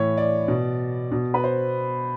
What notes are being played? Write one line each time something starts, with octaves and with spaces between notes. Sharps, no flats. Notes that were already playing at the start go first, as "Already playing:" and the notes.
Already playing: A2 E3 C#5
D5
B2
B2
B4
C5